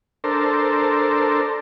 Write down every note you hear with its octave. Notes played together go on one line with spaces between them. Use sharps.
D4 A4 A#4 C5